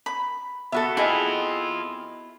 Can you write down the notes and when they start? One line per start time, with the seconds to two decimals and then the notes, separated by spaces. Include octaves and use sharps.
0.06 B5
0.72 B3 F#4 A4 E5
0.97 C4 E4 F4 G#4 D#5 G#5